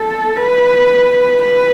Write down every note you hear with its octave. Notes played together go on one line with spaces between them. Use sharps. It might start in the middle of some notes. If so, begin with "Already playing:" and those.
Already playing: A4
B4
B4